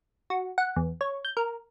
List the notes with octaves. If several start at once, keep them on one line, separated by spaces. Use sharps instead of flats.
F#4
F#5
E2
C#5
G6
A#4